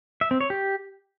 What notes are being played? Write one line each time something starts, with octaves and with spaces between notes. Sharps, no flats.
E5
C4
C#5
G4